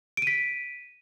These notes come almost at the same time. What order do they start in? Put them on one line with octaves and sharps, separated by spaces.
D7 D#7 B6